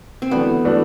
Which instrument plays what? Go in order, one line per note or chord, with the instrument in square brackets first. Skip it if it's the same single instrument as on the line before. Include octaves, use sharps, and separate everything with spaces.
[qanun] C4
[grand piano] E3 A3 D4 F#4 [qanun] B3
[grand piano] E3 A3 D4 F#4